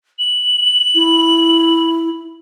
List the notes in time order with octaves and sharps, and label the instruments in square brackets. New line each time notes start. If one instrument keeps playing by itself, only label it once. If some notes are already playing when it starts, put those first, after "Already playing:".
[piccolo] F#7
[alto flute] E4